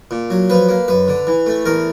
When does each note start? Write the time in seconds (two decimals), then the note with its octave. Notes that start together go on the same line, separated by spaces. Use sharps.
0.11 A#2
0.30 F#3
0.50 F3 B4
0.69 A#3
0.88 F#2 B4
1.08 D3
1.27 E3
1.46 A3
1.66 E2 A#4